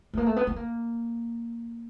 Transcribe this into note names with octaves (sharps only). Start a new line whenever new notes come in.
A3
A#3
A3
B3
B3
A#3